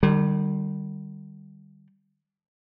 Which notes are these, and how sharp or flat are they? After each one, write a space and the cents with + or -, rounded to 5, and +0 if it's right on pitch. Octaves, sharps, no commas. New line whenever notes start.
D#3 -45 G3 +0